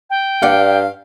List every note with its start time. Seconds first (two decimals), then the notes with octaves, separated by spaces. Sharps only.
0.10 G5
0.42 G2 D5 F5 F#5